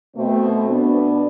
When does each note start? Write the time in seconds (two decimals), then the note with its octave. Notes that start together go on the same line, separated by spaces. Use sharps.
0.16 B2 A3 C4
0.69 B2 B3 D4